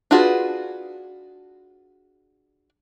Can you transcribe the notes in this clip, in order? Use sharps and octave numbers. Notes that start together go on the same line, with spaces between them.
D4 F4 F#4 G#4 B4